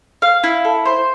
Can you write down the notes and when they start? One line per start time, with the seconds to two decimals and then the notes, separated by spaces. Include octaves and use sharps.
0.22 F5
0.44 E4
0.65 A4
0.86 C5